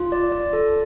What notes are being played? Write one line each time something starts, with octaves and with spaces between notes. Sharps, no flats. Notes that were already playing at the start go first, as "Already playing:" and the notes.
Already playing: F4
D5
D5
A4